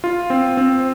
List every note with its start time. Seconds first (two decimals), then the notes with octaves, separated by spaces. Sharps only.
0.04 F4
0.30 C4
0.57 C4